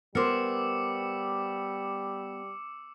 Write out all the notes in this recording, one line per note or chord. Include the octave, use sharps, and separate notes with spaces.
G3 B3 A#4 C5 D6 E6 C#7